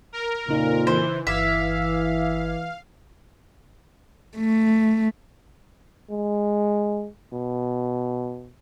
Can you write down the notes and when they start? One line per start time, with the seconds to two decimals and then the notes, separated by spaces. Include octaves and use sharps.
0.12 A#4
0.49 F2 A#2 C#3 D#4
0.87 E3 C5
1.27 G1 E3 E5 F5 D6 G#6
4.38 A3
6.10 G#3
7.33 B2